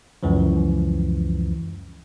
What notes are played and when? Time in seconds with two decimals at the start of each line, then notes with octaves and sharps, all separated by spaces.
0.23 C#2 F#2 E3 F3